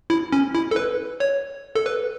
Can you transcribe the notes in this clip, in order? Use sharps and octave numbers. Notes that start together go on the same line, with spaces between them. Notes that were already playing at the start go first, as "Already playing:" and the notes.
E4
C#4
E4
A4
B4
C#5
A4
B4